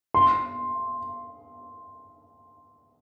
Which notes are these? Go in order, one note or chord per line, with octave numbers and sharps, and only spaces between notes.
C6